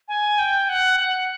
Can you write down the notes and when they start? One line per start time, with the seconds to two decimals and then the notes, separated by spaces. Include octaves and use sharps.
0.08 G#5
0.38 G5
0.69 F#5
1.00 F#5